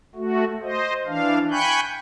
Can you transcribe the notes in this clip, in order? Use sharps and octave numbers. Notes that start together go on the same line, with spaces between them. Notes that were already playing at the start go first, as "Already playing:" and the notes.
A3 F#4
C5 D#5
E3 D4 F5
G5 G#5 B5 C#6 F#6 G6